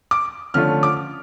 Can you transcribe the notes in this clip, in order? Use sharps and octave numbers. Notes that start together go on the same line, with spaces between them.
D6
D3 F3 A3 C#4 F4 F6
D6